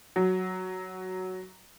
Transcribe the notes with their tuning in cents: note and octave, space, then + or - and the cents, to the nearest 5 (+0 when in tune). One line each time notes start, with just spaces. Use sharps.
F#3 +5